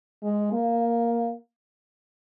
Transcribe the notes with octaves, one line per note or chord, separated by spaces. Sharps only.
G#3
A#3